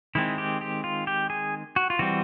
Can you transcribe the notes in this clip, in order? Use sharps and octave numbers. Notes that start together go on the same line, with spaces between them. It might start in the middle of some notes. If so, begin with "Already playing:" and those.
D#3 G#3 C4 E4
G4
G4
F4
G4
G#4
F#4
F4
E3 G3 C4 F#4